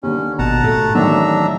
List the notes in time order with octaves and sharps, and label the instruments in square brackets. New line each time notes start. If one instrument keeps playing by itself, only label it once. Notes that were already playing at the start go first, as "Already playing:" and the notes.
[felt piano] D#2 D3 [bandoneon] C#4
[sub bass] G#1 [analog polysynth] B2 [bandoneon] F#5 A5 A#5
[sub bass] A2 [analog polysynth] A3
[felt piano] A1 A2 D#3 [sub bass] F#3 [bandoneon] D4 E5 A#5